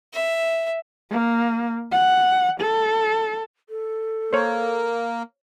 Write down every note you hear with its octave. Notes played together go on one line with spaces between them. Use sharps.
E5
A#3
F#5
A4
A4
A#3 C5 C#5